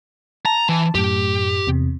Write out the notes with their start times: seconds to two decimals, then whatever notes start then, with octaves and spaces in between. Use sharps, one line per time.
0.46 A5 A#5
0.69 E3
0.95 F#2 A2 G4
1.67 E2 C3